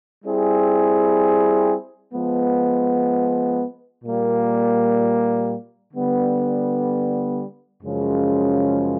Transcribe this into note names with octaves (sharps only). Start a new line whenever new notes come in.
G3 C4 E4 G#4
F3 G#3 B3
A#2 G3 A#3
D3 G3 B3
F#2 C#3 F3 G#3 C#4